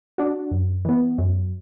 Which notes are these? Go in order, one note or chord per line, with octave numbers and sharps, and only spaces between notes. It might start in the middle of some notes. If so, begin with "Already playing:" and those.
D4 F#4
F#2
E3 B3
F#2